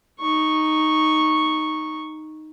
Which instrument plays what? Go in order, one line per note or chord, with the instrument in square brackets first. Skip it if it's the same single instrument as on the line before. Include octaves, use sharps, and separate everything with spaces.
[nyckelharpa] D#4 C#6